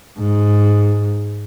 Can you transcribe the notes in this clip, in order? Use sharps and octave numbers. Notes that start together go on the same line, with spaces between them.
G#2